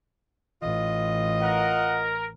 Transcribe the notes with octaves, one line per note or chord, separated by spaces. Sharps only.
A1 F4 D#5
A#4 F#5